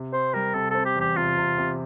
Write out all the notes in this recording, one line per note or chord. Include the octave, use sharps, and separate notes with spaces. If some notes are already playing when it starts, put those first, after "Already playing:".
Already playing: C3
C4 C5
G3 A#4
C3 A4
C4 A4
G4
E2 G4
C3 F4
C3
C3